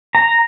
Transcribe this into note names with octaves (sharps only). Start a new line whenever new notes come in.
A#5